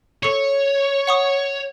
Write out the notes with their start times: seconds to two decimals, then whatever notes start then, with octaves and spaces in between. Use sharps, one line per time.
0.23 A4 C#5 C#6
1.07 F#5 C#6 D#6